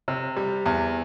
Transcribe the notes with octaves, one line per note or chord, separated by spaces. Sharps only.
C3
G3
E2